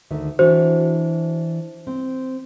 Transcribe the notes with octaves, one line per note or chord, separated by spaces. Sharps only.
D2 D#3 E5
E3 D4 F#4 C5
C4